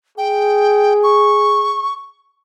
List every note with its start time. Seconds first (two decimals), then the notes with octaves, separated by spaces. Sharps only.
0.18 G#4 G5
1.03 C#6